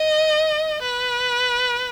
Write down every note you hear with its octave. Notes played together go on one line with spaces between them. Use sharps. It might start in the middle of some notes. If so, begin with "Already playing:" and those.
Already playing: D#5
B4